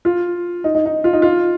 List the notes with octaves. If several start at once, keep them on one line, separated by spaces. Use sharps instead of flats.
F4
D#4
D#4
D#4
F4
D#4
F4